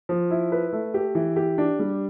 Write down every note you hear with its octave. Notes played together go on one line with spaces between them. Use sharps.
F3
E4
B4
A3
G4
E3
G4
D4
G3